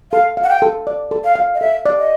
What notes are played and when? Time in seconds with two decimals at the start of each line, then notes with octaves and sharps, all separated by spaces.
0.12 A4 F5
0.37 F5
0.44 F#5
0.49 G5
0.62 A4
0.87 D5
1.11 A4
1.24 F5
1.35 F5
1.55 D#5
1.61 A4 E5
1.86 D5
1.98 D#5